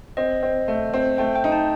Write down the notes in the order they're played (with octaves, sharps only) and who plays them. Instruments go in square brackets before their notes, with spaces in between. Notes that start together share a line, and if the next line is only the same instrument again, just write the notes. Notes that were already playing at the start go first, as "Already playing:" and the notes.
[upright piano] C4 [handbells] D#5
[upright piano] C4
A3
C4
[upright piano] A3 [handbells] G5
[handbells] G5
[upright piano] D#4
[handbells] A5